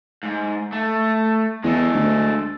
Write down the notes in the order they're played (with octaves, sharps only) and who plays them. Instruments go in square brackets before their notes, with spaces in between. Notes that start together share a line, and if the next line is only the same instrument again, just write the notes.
[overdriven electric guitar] G#2
A3
[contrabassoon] E2 [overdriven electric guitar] G#3 A4
[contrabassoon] D2